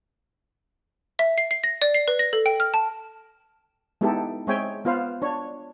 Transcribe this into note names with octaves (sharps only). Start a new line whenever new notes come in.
E5
C7
C7
A#6
D5
C7
B4
A#6
A4
G5
F6
A5
G#3 B3 D#4 E4 G4 A4
G#3 C4 C#5 E5 G5 G#5
B3 F4 B4 C5 F5
D4 C#5